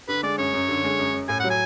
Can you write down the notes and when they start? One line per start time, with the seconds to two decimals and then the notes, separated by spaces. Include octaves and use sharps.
0.08 D3 B4
0.23 G#3 D5
0.38 F#2 C#5
0.54 F#2
0.69 D3
0.84 G#3
0.99 F#2
1.14 F#2
1.29 A2 G#5
1.40 F#3 F#5
1.50 G#5